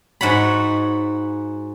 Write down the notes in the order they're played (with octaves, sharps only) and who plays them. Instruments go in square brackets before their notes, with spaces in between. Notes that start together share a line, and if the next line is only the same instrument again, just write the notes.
[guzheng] G#2 F#4 C#5 B5